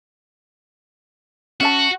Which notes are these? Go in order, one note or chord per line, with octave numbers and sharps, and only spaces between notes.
C#4 F#4 E5 A5